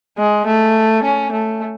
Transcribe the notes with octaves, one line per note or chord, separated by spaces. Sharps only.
G#3
A3
C#4
A3